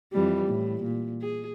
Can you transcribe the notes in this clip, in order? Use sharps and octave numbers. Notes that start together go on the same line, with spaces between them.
F2 E3 G3
A2
A#2
G#4